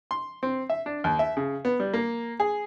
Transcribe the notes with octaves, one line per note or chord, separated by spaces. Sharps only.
C6
C4
E5
D4
D#2
E5
C#3
B3
G3
A#3
G#4